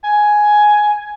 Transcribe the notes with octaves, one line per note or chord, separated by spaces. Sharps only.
G#5